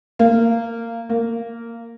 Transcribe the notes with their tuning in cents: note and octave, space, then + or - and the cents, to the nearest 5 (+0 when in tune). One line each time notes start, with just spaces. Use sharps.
A#3 -15
A#3 -10